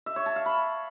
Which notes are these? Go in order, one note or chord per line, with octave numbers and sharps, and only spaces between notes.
E5
C#5
A5
F5
B5